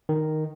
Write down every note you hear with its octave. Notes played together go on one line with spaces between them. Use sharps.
D#3